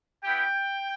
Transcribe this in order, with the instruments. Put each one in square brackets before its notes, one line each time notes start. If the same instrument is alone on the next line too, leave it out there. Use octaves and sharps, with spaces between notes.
[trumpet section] B3 E4 G4 G5